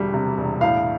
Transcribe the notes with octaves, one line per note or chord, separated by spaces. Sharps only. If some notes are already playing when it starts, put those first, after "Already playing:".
Already playing: E1 D2 G3
C3
E1
A2 F5